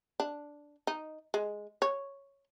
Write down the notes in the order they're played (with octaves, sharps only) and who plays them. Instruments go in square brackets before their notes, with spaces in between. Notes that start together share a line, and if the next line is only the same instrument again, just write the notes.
[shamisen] D4
D#4
G#3
C#5